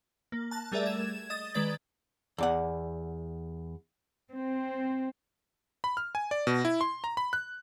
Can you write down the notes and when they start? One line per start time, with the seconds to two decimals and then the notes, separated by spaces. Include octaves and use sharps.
0.32 A#3
0.51 A5 F#6
0.72 G3 A3 G#4 A#4 D5 E5
0.86 G#6 E7
1.30 D#5 D#6 A6
1.54 D#3 G#3 B4 D5 A6
2.38 E2 D5 F#5
4.31 C4
5.84 B5
5.97 F6
6.15 G#5
6.31 D5
6.47 B2
6.65 E4
6.81 C6
7.04 A#5
7.17 B5
7.33 F#6